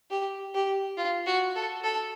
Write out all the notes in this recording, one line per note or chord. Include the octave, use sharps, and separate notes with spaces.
G4
G4
F4
F#4
A4
A4